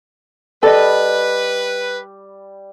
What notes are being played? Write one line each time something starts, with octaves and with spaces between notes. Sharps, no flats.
G3 A4 B4 D#5